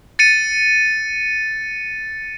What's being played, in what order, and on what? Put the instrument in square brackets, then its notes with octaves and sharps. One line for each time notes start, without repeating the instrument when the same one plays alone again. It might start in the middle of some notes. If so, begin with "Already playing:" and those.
[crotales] A6 C#7 D#7